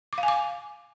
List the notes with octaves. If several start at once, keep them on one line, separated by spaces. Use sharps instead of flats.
D6
F5
G#5
D6